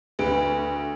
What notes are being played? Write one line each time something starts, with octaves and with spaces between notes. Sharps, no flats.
D2 B4 D7